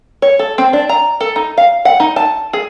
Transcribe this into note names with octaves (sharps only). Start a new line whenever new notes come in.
C#5
A4
C4
D4
A#5
A4
D#4
F5
F#5
D#4
A5
G#4